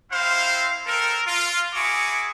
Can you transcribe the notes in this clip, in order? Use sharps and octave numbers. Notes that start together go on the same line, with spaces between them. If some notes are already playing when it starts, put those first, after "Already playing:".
C4 E4 C5 F5
C4 A4 A#4
F4
E4 F#4 G#4 C#6 D6